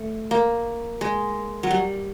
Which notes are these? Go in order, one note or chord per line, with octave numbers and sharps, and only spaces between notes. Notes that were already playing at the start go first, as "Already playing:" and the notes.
Already playing: A3
A#3
G#3
F#3
G3